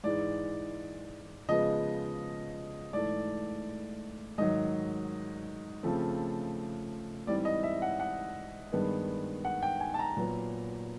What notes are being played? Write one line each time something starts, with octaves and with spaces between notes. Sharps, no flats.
G#2 E3 G#3 D5
C#3 F3 G#3 B3 D#5
G#2 E3 A3 D5
G#2 D#3 F#3 D#5
C#3 F3 A3 C4
G#2 E3 G3 C4 D5
D#5
E5
F#5
F#5
G2 D#3 G#3 B3
F#5
G5
G#5
A5
A#5
A#2 F#3 B3